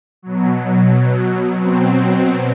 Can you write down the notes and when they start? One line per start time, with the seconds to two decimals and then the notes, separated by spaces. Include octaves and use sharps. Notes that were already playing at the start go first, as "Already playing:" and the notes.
0.22 B2 F#3
1.59 B2 F#3 C4